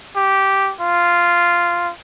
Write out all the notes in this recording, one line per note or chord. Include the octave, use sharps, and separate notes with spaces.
G4
F4